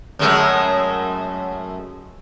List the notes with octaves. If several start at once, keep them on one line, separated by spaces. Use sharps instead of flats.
F#2 G#3 A3